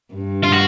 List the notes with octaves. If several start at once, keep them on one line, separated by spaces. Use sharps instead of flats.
G2
F4
F#4